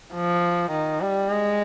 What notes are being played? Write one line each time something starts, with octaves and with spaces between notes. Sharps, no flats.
F3
D#3
G3
G#3